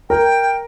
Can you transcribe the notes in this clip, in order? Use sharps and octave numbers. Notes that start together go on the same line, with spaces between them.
A#4 G5